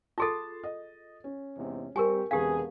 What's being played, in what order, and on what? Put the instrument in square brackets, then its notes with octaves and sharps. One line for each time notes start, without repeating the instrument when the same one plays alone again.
[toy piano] F4 G#4 A4 [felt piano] A5 C6 A6
[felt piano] D#5
C#4
[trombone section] E2 G#2 C3
[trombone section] G3 C4 [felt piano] G4 C#6 [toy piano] A#4 G#5
[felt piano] E1 B4 G#5 [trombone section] C3 G#4 [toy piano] G4 F5